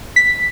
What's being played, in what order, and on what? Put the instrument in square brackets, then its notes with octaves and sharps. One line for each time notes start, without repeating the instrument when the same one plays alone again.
[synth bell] B6